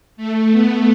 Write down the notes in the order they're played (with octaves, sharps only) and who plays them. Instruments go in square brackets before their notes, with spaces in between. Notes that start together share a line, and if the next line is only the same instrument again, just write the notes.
[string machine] A3
B3